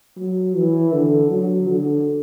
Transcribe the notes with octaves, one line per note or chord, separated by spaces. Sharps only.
F#3
E3
D3
F#3
D3